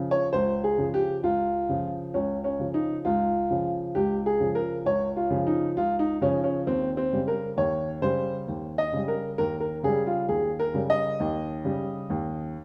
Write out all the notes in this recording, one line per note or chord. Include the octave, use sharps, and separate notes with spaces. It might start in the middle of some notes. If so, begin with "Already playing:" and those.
Already playing: C#3 F3
C#5
C#2 C5
G#4
C#3 F3
G4
C#2 F4
C#3 F3
C#2 C#4
C#4
C#3 F3
D#4
C#2 F4
C#3 F3
C#2 G4
G#4
C#3 F3
A#4
C#2 C#5
F4
C#3 F3
D#4
C#2 F4
D#4
C#3 F3 C#4
C#4
D#2 C4
C4
C#3 G3
A#4
D#2 C#5
C#3 G3 C5
D#2
D#5
C#3 G3
A#4
D#2 A#4
A#4
C#3 G3 G#4
F4
D#2 G#4
A#4
C#3 G3
D#5
D#2
C#3 G3
D#2